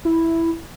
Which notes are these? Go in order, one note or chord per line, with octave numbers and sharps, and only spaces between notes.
E4